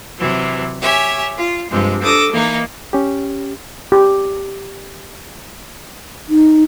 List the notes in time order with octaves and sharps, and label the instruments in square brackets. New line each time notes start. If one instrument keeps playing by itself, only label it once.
[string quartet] C3 E3 F#3
G4 C#5 E5 G#5
F4
G2 C3 F3 G#3
D4 A4 D6 D#6 A#6
E3 A#3 D#4
[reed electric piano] C#4 G4
[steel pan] G4
[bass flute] D#4